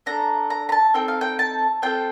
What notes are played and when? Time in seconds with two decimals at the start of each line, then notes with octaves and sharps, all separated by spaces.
0.06 D4 A4 A#5
0.50 A#5
0.69 A#5
0.72 A5
0.94 C4 D#4 A4 G5
1.08 F5
1.21 G5
1.39 A5
1.82 C4 F4 A4 G5